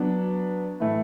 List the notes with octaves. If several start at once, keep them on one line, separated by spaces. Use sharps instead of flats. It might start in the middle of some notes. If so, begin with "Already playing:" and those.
Already playing: F#3 B3 D4
A2 E3 A3